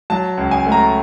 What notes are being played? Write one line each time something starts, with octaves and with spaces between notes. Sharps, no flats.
F#3 A5
C#2
G#5
A3
A#5